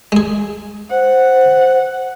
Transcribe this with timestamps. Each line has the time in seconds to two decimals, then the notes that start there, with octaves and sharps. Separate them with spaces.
0.12 G#3 G#4
0.91 C5 F#5